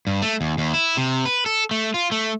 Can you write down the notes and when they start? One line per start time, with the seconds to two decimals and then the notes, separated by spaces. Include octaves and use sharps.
0.07 G2
0.22 A3
0.41 D#2
0.58 D#2
0.74 E4
0.97 C3
1.25 B4
1.46 A4
1.71 A3
1.94 F4
2.12 A3